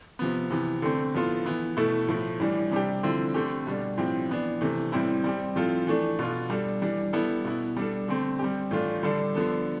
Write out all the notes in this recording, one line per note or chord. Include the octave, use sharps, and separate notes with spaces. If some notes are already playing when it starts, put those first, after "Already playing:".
C3 F3 B3
C3 E3 B3
D3 A3 C4
A2 F3 B3 F4 A4
E3 B3 E4
B2 A3 E4 A4
A2 F3 A3 E4
A2 E3 G3 D4
C3 G3 D4 G4
D3 F3 C4 E4
D3 A3 C4 G4
B2 G3 D4
A2 F3 C4 G4
E3 B3 D4
C3 E3 A3
A2 G3 C4 E4
G3 C4 G4
A2 F3 C4 F4 A4
E3 A3 D4
B2 B3 F4
G3 D4 A4
E3 G3 D4
G3 B3 E4 A4
B2 B3 E4
G3 D4 A4
D3 A3 C4
G3 C4 G4
A2 E3 A3 D4 F4
D3 G3 D4 A4
D3 F3 B3 D4 A4